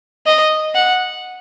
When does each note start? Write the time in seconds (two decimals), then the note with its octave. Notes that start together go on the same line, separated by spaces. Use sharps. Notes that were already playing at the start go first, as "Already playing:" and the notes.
0.26 D#5
0.75 F#5